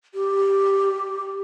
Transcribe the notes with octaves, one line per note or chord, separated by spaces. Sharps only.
G4